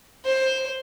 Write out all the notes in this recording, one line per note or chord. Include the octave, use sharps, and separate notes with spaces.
C5